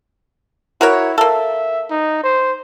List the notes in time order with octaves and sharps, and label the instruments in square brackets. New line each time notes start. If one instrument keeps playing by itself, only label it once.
[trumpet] E4 [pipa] F#4 A#4 C#5
[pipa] A#3 A4 [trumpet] E5
[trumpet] D#4
C5